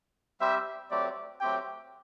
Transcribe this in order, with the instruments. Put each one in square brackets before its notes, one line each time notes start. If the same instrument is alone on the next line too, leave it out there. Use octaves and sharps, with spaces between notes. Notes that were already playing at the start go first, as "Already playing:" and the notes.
[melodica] G3 C4 G4 C5 [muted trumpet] E5
[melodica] F#3 A3 C4 G4 [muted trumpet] D5
[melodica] F#3 A3 C4 G4 [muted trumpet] G5